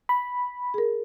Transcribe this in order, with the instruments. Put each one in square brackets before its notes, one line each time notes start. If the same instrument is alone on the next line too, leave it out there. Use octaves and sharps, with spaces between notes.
[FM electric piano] B5
[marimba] G#4 A#4